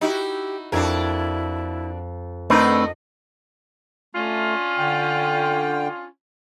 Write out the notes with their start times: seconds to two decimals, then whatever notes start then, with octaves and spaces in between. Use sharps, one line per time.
0.01 D#4 E4 F#4 G4
0.72 F2 D4 E4 F#4 A#4 G#6
2.50 D3 A3 C4 D#4 A#4 B4 D#5
4.15 A3 C#4 D4 F4
4.78 D3 G5